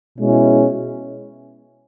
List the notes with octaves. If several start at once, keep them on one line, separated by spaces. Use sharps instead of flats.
B2 G#3 C#4 E4